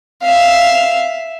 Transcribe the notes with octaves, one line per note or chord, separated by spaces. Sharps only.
E5 F5